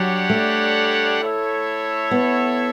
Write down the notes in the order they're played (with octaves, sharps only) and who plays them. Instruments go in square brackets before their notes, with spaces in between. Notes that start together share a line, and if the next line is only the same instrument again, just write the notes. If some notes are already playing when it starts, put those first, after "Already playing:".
Already playing: [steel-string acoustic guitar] F#3 [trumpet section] G3 D4 G4 C#5 F#5
[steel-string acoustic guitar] A3
[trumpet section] E4 A4 C#5 E5
[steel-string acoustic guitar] B3